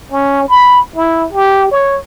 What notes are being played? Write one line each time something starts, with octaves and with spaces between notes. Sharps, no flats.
C#4
B5
E4
G4
C#5